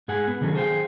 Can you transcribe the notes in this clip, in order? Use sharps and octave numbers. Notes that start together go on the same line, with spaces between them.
G#2 G#4 F#5 G#5
B3
C3 D#3 F#3 C#4 A4
G#4 C5 F5 G5